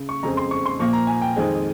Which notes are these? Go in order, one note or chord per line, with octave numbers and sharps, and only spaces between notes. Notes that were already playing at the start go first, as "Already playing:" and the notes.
Already playing: C#3
C#6
F2 C#3 G#3 C4 A#5
C6
C#6
C6
A#2 F3 A#3 C#6
A#5
G#5
G5
F2 D#3 G#3 C4